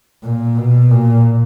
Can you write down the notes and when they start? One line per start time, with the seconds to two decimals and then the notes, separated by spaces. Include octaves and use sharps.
0.24 A#2
0.57 B2
0.91 A#2